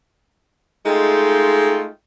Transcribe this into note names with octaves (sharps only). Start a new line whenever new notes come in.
G#3 A3 D#4 F4 G5